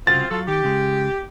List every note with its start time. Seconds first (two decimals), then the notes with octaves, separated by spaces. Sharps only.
0.07 C2 C#3 C4 F4 F#4 A6
0.31 F#3 F4 A4
0.48 D#3 G4
0.64 C#3 G#3